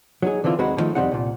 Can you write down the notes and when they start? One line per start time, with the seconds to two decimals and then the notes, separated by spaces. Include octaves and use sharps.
0.22 F#3 D#4 G#4
0.44 D3 E3 C4 E4 F4
0.59 D#2 G#3 C4 D#4 F#4 B5
0.77 D3 D#3 F3 A3 D#4
0.95 F2 A#2 G3 C4 D#4 F#5
1.11 C2 A#2